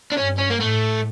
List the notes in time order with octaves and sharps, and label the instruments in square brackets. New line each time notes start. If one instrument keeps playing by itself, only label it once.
[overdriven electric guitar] D4
[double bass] G2 [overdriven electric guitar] C#4
[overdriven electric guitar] C#4
A#3
[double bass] A2 [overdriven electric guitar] A3